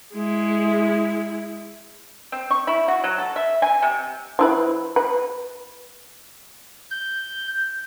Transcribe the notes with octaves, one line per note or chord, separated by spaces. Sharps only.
G#3 E4
C4
C#6
E4
F#4
F#3
A4
E5
G#5
C3
F3 E4 B4
B4
G6